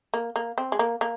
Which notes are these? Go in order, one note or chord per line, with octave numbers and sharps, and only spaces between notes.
A#3
A#3
C4
G#3
A#3
A#3